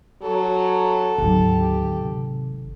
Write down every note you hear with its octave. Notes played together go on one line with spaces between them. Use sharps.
F#3 A4
G#1 D2 D3 F#3 G4
C3